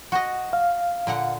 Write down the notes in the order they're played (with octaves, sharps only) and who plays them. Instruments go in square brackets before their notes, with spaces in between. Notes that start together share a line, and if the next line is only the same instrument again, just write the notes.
[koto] F#4 D#5
[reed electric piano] F5
[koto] A#2 D3 F#5